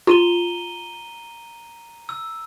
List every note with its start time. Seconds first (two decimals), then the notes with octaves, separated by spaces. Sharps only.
0.07 F4 A#5 D#7 G7
2.09 E6